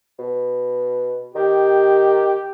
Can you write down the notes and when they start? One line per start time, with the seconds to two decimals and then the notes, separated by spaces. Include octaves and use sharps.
0.19 B2
1.35 D#3 G4